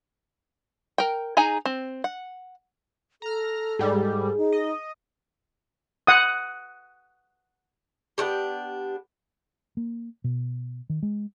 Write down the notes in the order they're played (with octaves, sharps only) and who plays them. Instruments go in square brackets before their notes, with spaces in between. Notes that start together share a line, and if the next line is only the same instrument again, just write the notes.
[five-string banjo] A#4 G5
D#4 G#4 G#5 A#5
C4
F#5
[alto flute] A4 [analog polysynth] A#5 F6
[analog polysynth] G#2 G3 [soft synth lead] G#4
[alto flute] D#4
[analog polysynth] D#5
[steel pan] F#5 D#6
[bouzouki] B3 D4 F#4 G4
[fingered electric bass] A#3
B2
D#3
G#3